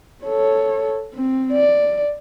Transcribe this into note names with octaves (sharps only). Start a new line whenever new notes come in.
A4 C#5
C4
D5